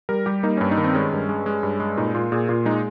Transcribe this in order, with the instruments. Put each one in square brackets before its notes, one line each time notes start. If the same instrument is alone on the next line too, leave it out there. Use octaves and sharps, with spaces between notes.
[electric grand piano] G3 A#4
G3 G4
A#3 D#4
G2 C#4
D#4
D#3
C4
G#3 C#4
G2
G#3
G#3
G2
G#3
A#2 D#4
A#2 F4
A#2 G#4
A#2 F4
G#3 D#4